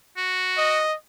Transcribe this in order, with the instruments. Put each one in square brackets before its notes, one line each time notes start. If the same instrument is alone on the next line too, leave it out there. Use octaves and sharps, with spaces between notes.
[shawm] F#4
[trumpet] D#5